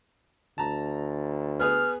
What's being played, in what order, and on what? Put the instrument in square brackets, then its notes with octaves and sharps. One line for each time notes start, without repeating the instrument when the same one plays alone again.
[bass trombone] D2 [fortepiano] A5 A#5
[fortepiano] B3 G#4 B4 [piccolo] F6